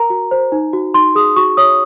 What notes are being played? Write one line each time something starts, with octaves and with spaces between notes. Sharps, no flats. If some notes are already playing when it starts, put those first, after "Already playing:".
Already playing: A#4 A#5
F#4
C5
D#4
F#4
D#4 C6
G#4 D#6
F#4 C#6
C#5 D#6